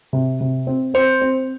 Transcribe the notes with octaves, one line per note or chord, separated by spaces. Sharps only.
C3
C3
C4
C4 C5
C4